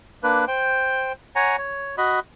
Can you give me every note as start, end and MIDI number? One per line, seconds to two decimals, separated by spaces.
0.23 0.45 58
0.23 0.45 62
0.23 0.45 71
0.48 1.12 72
0.48 1.12 79
1.36 1.57 73
1.36 1.57 78
1.36 1.57 80
1.36 1.57 82
1.58 1.96 73
1.98 2.20 66
1.98 2.20 75
1.98 2.20 83